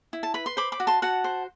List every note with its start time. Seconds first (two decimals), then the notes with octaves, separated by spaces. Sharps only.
0.13 E4
0.23 A5
0.34 B4 B5
0.46 C6
0.57 C5 B5 D6
0.72 B5 D6
0.80 F#4
0.87 A5 C6
1.02 F#4 F#5 A5
1.24 C5